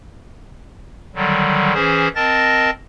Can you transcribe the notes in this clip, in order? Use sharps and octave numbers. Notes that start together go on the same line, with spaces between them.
D3 D#3 F#3 G3
E3 C#4 G#4 C5
C4 A#4 D#5 A5 A6 A#6